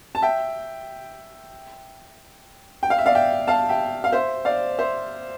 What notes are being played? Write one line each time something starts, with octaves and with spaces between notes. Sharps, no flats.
A5
E5 G5
G5
F5
E5
D5 F5
E5 G5
F5 A5
E5 G5
F5
C5 E5
D5 F5
C5 E5